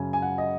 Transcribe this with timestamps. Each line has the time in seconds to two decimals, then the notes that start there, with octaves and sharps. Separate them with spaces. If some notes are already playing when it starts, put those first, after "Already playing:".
Already playing: F#2 C#3 G#5
0.13 G#5
0.22 F#5
0.38 D#5